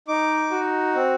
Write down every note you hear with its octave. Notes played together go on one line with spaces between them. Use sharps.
D#4 D6
F#4
C4